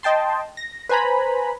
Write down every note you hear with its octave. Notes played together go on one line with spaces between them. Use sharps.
D#5 G5 A5 C6
A#6
B4 C5 G#5 A#5 B5